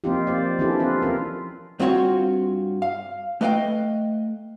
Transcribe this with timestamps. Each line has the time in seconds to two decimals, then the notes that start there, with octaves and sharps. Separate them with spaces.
0.04 F3 A#3 C4 D#4 F4 G4
0.27 A#3 C5 D5
0.59 E3 C#4 D4 E4 G4 A4
0.79 C4 F4 B4
1.02 F3 C#4 F4 A#4
1.79 G2 C4 F4 F#4 A#4 C#5
2.82 F5
3.41 A3 B4 D#5 F5 G5